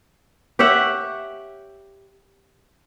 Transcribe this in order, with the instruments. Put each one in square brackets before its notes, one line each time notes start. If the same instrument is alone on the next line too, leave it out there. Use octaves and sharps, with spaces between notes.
[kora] G4 C#5 E5 F#5